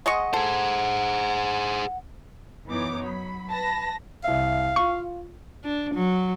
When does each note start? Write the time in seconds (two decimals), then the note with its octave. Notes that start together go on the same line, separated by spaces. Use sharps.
0.06 G#3 D#5 F#5 C#6
0.33 G#4 A4 C5
2.67 F#2 E3 B3 D#4 C#5 D6
3.04 F#3 B5
3.49 B4 A5 B5 A#6
4.24 C2 E5 F5
4.76 F4 C#6
5.64 D4
5.95 F#3